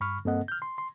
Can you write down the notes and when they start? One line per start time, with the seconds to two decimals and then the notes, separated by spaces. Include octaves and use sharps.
0.01 G2 B5 C#6 F6
0.25 G2 A#3 C4 A4 D#5 F#5
0.48 F6 G6
0.62 C6
0.78 C6